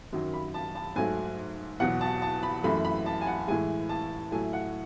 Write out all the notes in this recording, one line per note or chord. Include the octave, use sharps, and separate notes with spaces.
F#2 D#3 F#3
B5
A5
A5
G#2 F#3 A3 G#5
E2 B2 F#3 F#5
A5
A5
B5
F#2 E3 A3 B5
B5
A5
G#5
F#5
A2 E3 G#3 G#5
A5
A2 F#3 A3 G#5
F#5